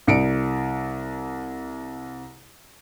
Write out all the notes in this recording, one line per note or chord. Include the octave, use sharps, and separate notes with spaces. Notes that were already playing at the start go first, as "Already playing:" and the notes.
C2 C#7 D7